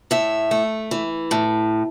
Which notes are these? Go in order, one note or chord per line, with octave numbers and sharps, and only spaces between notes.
A2 E5
A3
E3
A2